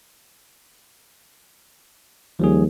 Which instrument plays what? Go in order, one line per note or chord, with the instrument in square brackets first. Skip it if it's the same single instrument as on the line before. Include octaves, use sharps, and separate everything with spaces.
[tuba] D#2 [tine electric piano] F3 G3 G#4